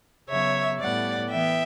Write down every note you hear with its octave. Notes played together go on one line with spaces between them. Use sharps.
C#3 F#3 B3 C#5 E5
A2 G3 B3 D5 F#5
E3 B3 E5 G5